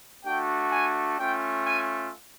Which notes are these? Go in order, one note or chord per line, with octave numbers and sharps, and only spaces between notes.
A3 D4 F#4 G5
G#5
A3 C#4 F4 G5
G#5